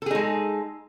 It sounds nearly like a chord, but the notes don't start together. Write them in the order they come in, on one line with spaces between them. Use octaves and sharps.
A4 G#4 D#4 G#3